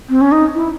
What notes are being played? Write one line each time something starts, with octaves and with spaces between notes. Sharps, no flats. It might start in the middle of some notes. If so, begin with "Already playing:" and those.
C4
C#4
D#4
E4